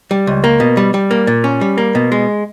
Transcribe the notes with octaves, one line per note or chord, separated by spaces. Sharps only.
G3
C#2
A#3
B2
G3
G3
A#3
A#2
C#4
G3
A#3
B2
G#3